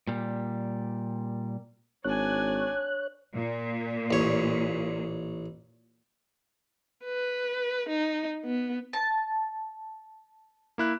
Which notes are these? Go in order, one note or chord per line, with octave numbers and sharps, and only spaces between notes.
A#2 G3
G#1 D4 C#5 G#5 F#6
A#2
A1 C#5
B4
D#4
B3
A5
A#3 E4 F#6